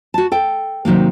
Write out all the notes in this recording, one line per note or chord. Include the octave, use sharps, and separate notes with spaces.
F#4 A5
A4 G5
C3 D#3 F#3 A#3